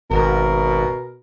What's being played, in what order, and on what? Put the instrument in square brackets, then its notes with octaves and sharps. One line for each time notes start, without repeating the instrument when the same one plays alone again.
[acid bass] G#1 [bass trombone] B2 [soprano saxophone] A#4